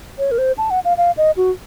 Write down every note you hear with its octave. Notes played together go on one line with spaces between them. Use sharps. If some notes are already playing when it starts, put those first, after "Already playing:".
C#5
A#4
C5
A5
F#5
F5
F5
D#5
F#4